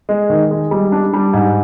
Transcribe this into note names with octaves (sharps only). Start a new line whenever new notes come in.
G#3
D#3
G#3
G3
D4
G3
G#2